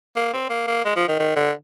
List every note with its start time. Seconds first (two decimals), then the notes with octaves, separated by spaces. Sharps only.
0.16 A#3
0.33 C4
0.50 A#3
0.68 A#3
0.85 G#3
0.96 F3
1.08 D#3
1.19 D#3
1.36 D3